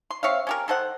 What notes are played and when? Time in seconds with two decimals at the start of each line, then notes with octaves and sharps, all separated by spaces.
0.11 C6
0.23 C4 C#5 E5 F5
0.47 C#4 G4 A#4
0.68 D#3 A4 C5 F#5